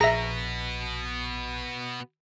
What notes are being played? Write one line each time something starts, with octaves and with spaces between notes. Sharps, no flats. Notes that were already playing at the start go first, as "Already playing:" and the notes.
A#1 B2 B3 G#4 E5 A#5